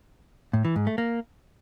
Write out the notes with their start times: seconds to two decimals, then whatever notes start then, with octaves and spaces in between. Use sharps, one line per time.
0.53 A2
0.65 E3
0.76 G#2
0.87 A3
0.98 A#3